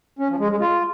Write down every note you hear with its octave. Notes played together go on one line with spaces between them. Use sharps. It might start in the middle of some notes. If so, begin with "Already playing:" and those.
C#4
F3
G#3
G#3
F4